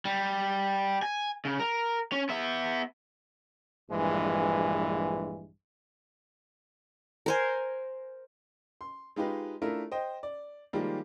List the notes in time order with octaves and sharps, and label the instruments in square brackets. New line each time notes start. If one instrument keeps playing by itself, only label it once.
[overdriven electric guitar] G3
G#5
C#3
A#4
C#4
B3 E5
[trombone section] A#1 G2 E3 G#3
[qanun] A#4 C5 G#5
[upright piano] C6
G#3 D#4 F4 G4 B4
A3 D4 E4 F4 A#4
C5 D#5 G5
D5
D#3 F3 G3 G#3 A#3